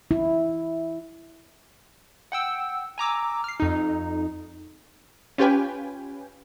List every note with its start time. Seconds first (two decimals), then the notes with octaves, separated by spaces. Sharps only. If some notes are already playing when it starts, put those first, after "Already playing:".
0.11 E4
2.32 F#5 G5 E6
2.98 G#5 A#5 D6 E6
3.44 F6 C7
3.60 F2 D#4
5.38 C#4 F4 G4 B4 G5 G#5